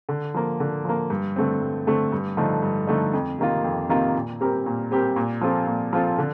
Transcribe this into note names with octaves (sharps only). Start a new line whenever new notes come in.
D3
F3 A#3
D3
F3 A#3
G2
D3 A3 C4
G2
D3 A3 C4
G2
D3 F3 A3 D#4
G2
D3 F3 A3 D#4
F2
C3 D#3 A#3 F4
F2
C3 D#3 A#3 F4
A#2
G3 C4 G4 A#4
A#2
G3 C4 G4 A#4
A#2
F3 C4 F4 A4
A#2
F3 C4 F4 A4
D3